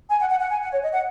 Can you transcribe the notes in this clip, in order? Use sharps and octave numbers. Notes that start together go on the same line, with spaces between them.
G#5
F#5
F#5
F#5
G#5
F#5
C#5
D#5
F#5